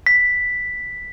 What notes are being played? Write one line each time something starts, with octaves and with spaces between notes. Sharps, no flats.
B6